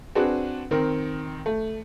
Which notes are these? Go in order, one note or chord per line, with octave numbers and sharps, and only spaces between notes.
C4 D4 F#4 G#4 B4
D#3 C4 A#4
A3